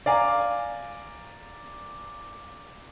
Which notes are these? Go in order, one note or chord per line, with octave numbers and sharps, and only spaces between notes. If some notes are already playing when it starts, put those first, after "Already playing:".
D5 F5 G#5 A#5